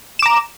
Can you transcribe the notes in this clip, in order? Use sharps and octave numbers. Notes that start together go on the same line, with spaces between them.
A#5 D6 E7